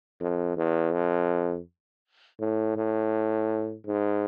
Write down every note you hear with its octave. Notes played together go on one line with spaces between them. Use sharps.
F2
E2
F2
A2
A2
G#2